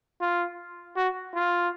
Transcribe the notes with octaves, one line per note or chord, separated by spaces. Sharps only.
F4
F#4
F4